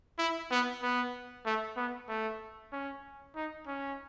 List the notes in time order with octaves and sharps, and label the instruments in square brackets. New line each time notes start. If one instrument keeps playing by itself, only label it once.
[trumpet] E4
B3
B3
A3
B3
A3
C#4
D#4
C#4